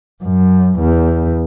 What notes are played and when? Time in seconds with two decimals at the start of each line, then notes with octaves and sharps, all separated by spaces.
0.23 F#2
0.79 E2